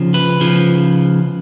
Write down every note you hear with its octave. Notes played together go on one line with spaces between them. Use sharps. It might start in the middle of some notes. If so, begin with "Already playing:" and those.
Already playing: C#3 F3
B4
C#3 F3